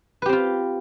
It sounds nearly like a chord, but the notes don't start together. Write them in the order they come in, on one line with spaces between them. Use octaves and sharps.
B4 G4 C4 F4